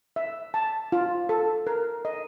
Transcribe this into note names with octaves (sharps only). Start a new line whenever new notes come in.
E5
A5
F4
A4
A#4
D#5